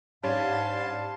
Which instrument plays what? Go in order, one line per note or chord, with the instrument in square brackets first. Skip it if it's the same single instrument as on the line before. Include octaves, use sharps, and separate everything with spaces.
[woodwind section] G#2 [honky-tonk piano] G3 C#4 D4 [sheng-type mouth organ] F5 A5 C6